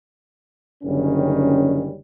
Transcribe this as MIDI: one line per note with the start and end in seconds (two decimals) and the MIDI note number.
0.84 1.96 30
0.84 1.96 50
0.84 1.96 51
0.84 1.96 55
0.84 1.96 61